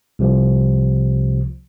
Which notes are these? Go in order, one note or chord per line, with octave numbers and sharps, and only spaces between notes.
C2 C3 F3